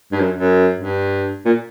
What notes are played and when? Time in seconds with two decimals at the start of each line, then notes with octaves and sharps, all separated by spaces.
0.12 G2
0.20 F#2
0.37 F#2
0.79 G2
1.45 A#2